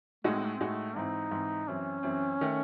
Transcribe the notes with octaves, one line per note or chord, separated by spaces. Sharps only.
A2 G#3 A3 D#4 F#4
C4
A3
C4
A2 G#3 A3 D#4 F#4
G#2 E3 C4 D#4 E4
G#2 E3 C4 E4
F#2 E3 C4 C#4
F#2 E3 C4
D#3 A3